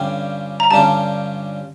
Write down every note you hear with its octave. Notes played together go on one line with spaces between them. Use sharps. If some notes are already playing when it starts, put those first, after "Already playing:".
Already playing: G2 D3 G3 C#4 F4 G5
A#5
G2 D3 G3 C#4 F4 A5